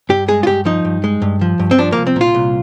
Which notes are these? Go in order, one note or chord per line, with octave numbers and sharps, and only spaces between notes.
G2 G4
G#3 G#4
F4
G2 G4
F3 D#4
G2
G#3
G2
F3
G2
C4
F3 D4
A#3
C2
C4
A#2 F4
C2